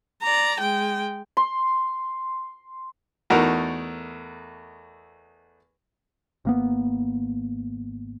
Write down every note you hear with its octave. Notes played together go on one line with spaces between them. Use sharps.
D5 A#5
G#3 G5
C6
E2 A3 D#4 F#4 A4 A#4
G#1 A#3 B3